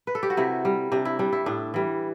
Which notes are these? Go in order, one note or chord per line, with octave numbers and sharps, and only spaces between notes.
B4
A4
G4
F#4
C3 E4
G3
C3 D4
E4
G3 D4
E4
A2 D4
E3 G3